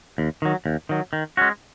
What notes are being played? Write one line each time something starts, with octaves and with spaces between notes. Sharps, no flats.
D#2
D#3 F#3
D#2
D#3 F#3
D#3
G#3 C#4 F#4